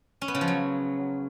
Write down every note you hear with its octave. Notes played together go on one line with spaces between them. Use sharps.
C#4
B3
C#3
F3
F#3